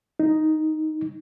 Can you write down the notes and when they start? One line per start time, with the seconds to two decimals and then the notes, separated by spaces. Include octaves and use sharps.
0.20 D#4